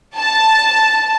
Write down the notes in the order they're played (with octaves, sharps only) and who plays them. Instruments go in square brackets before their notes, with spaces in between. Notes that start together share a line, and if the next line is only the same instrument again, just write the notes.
[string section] A5